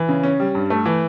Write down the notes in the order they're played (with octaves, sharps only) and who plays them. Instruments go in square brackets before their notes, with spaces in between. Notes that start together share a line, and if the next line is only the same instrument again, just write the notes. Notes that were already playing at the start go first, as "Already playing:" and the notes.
Already playing: [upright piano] E3
C#3
C#4
G3
G2
A3
E3